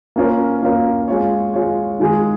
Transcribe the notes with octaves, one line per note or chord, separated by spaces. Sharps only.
A#3 C#4 F4 A#4
A#3 C#4 F4 A#4
G#3 F4 C#5
G#3 F4 C#5
D#3 G#3 F4 G#4